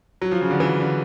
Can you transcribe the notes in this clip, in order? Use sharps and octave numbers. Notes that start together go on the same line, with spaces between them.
F#3
F3
C#3
D3
E3
D3